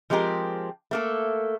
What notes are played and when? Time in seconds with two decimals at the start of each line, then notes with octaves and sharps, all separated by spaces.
0.10 F3 G#3 C4 G4 A#4
0.91 A3 A#3 A4